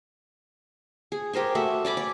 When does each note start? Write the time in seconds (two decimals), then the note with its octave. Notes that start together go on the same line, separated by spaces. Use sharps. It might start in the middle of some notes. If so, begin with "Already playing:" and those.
1.12 G#4
1.33 G4 A#4 C5 G#5
1.55 A3 F#4 E5
1.85 D5 G#5 B5 D6
1.97 D5